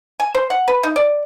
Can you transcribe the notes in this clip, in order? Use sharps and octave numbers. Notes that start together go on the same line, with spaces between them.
G#5
C5
F#5
B4
D#4
D5